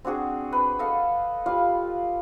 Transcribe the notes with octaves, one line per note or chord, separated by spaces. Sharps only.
C4 D4 F#4 G#4
B4
A4 D#5 F5
G3 F4 F5